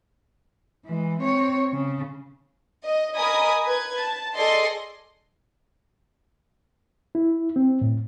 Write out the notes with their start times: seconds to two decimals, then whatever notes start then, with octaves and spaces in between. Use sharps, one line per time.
0.85 E3 G#3
1.20 C4 C#5
1.73 C#3
2.85 D#5
3.17 A#4 D#5 G#5 B5 D#6
3.66 B4 G#6
3.97 A5
4.34 G#4 A4 D5 D#5 C6
7.15 E4
7.56 C4
7.81 A2